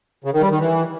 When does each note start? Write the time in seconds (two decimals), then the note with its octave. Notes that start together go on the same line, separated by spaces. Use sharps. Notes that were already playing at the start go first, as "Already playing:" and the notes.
0.24 C#3
0.33 D#3
0.42 G3
0.51 D#3
0.59 E3